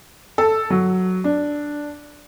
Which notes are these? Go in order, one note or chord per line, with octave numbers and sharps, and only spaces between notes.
A4
F#3
D4